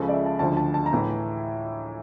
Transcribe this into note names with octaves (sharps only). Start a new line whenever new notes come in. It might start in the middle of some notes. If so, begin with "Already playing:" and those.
Already playing: C#2 C#3 F3 A4
D5
E5
A5
D2 D3 F3 A5
A5
A5
A#5
A2 E3